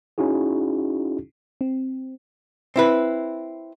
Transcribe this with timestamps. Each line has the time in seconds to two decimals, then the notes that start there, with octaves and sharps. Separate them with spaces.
0.18 C#4 D#4 E4 F#4 G#4
1.61 C4
2.76 C4 E4 B4